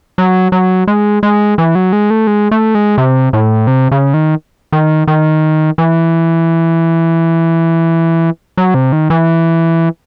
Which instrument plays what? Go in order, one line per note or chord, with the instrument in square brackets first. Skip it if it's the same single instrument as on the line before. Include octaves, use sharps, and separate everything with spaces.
[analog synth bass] F#3
F#3
G#3
G#3
E3
F#3
G#3
A3
G#3
A3
G#3
C3
A2
C3
C#3
D#3
D#3
D#3
E3
F#3
C3
D#3
E3